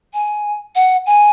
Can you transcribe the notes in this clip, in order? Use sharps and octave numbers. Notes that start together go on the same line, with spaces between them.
G#5
F#5
G#5